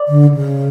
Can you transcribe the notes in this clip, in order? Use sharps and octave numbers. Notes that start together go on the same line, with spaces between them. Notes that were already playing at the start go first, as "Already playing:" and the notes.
Already playing: D5
D3
C#3